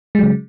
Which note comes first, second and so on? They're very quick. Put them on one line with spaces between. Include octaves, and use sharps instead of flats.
G#3 F#3 C#3